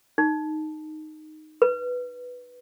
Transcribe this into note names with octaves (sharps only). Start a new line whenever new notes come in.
D#4
B4